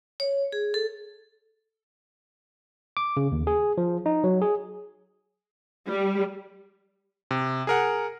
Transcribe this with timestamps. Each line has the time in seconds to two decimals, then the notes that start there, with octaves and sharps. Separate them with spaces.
0.20 C#5
0.52 G#4
0.74 A4
2.97 D6
3.17 C#3
3.32 D#2
3.47 G#4
3.78 F3
4.06 D#4
4.24 F#3
4.42 G#4
5.88 G3
7.31 C3
7.67 G#4 A#4 F#5